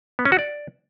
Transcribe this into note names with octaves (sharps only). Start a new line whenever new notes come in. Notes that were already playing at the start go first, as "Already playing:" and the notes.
B3
C#4
F#4
D5